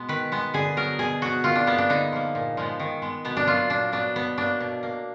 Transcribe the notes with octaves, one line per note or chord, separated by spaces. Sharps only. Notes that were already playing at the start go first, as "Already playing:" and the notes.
Already playing: B2 G#3 B3
D#3 B4
G#3 B3
D3 G#4
F#3 B3 A#4
B2 G#4
F#3 B3 F#4
D#3 F4
D4
A#3 B3
D4
D3 D#4
F3 A#3
A#2
F3 G#3 B3
D#3
G#3 B3
B2 B3
D4
F#3 A#3 F4
A#2 D4
F#3 B3 D4
B2 B3
F#3 A#3 D4
B2
A#3